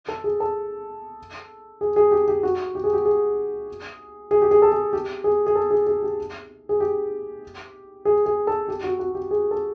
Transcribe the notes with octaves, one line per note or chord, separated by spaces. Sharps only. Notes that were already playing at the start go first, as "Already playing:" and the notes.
A4
G#4
A4
G#4
G#4
G4
G4
F#4
G4
G#4
G4
G#4
G#4
G4
G#4
A4
G#4
G4
G#4
G#4
A4
G#4
G#4
G4
G#4
G4
G#4
G#4
A4
G4
F#4
F#4
G4
G#4
A4